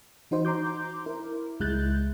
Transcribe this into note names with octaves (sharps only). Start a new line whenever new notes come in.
E3 D#4 F#4 C5
A#5 C6 D6 G6
E4 A#4
C#2 G#3 E4 F#6 G6 A6